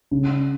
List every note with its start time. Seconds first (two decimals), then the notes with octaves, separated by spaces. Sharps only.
0.11 C#3